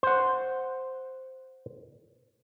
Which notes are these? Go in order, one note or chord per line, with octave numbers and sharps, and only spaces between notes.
C5 F#5